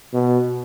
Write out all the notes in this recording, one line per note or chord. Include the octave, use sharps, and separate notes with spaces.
B2